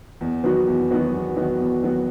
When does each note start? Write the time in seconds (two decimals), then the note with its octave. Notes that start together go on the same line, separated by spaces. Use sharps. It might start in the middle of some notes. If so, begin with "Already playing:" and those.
0.21 E2
0.44 D#3 F#3 B3 F#4
0.68 E2
0.91 D#3 F#3 B3 F#4
1.14 E2
1.36 D#3 F#3 B3 F#4
1.60 E2
1.83 D#3 F#3 B3 F#4